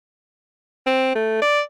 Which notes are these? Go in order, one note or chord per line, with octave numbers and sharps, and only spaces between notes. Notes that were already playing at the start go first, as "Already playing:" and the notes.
C4
A3
D5